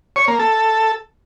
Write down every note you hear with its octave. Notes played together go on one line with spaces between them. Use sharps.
C#5
A#3
A4